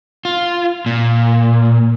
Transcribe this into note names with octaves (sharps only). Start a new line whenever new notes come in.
F4
A#2